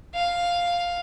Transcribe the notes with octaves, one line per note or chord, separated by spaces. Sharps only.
F5